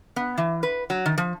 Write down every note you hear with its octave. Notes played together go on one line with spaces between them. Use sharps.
B3
E3
B4
F#3
D#3
F3